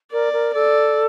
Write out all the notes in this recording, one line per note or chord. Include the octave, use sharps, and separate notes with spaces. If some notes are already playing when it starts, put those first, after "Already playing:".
A#4 D5
A#4
A4 D5